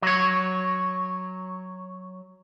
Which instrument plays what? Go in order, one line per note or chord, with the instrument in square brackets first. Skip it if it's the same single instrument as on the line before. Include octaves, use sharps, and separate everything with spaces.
[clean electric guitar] F#3 C#5